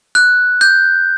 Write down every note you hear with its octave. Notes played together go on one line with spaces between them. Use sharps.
F#6
G6